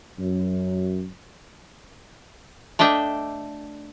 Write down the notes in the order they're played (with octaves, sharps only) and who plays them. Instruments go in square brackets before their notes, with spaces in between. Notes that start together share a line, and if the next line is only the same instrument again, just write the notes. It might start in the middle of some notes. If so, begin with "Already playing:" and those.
[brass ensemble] F#2
[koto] A3 D4 D#5 E5 G5